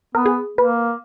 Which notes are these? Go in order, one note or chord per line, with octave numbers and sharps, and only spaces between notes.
B3 A#4
G#4
A#3 B4